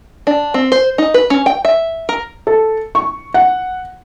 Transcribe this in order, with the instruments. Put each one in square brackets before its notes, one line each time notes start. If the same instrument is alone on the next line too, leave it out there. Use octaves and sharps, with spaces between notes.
[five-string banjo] D4
C4
C5
D#4
B4
C#4
G5
E5
A#4
[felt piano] A4
C#6
F#5